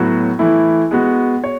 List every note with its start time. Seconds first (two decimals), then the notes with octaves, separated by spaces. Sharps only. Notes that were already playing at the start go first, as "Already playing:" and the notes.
Already playing: A2 F#3 B3 F#4
0.39 E3 A3 E4
0.91 G#3 B3 F#4
1.44 C#5